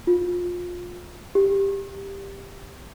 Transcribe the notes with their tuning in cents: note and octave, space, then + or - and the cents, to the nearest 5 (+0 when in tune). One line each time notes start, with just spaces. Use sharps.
F4 +25
G4 +10